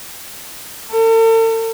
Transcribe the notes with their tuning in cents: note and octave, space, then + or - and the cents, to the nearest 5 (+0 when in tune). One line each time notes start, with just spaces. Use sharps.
A4 +45